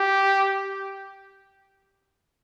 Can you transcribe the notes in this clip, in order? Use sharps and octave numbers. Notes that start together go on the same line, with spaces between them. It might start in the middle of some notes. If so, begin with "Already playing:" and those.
Already playing: G4